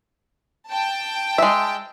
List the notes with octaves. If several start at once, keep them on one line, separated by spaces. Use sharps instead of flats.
G5 A5
G#3 E5